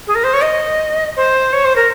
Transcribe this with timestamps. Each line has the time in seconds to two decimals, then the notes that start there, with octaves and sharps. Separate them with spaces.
0.07 G#4
0.15 A#4
0.24 C5
0.33 C#5
0.41 D#5
1.16 C5
1.53 C#5
1.65 C5
1.76 A#4